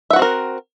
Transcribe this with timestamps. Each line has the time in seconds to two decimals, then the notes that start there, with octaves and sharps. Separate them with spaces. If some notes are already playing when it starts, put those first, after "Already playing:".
0.10 E5
0.13 F#5
0.16 F#4
0.19 C4
0.22 A#4